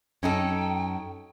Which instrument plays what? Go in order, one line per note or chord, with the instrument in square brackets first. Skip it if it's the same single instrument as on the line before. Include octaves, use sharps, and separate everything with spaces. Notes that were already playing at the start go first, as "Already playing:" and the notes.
[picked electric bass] F#2 [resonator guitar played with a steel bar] C#4 D#4 A4 [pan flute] G5